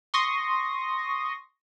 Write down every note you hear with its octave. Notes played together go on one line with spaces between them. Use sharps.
C6 C#6 D#6 A#6